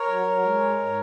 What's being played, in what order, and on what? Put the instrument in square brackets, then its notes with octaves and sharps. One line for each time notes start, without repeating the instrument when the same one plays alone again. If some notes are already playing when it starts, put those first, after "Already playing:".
Already playing: [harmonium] A#4 C#5
F#3
F#3
G#3
G#2
G#2